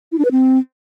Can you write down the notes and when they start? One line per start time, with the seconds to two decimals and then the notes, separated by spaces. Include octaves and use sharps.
0.12 E4
0.18 D4
0.25 B4
0.31 C4